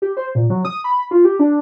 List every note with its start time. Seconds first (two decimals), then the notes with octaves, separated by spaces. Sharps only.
0.02 G4
0.17 C5
0.35 A#2
0.50 F#3
0.65 D#6
0.84 B5
1.11 F4
1.25 G4
1.39 D4